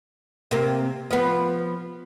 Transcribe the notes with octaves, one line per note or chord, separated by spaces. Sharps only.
C3 A#3
F3 B3